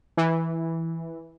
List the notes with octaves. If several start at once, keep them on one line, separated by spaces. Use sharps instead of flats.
E3